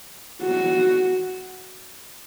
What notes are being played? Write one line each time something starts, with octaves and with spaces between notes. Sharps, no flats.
F#4